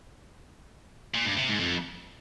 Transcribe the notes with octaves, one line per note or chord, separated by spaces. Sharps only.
A#2
G2
C3
G#2
F2